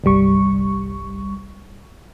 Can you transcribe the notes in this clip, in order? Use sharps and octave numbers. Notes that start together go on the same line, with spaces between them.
G1 C2 G3 C#6